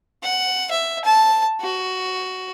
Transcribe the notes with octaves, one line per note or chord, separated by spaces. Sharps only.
F#5
E5
A5
F#4